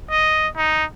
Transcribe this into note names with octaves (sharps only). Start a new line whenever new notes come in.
D#5
D#4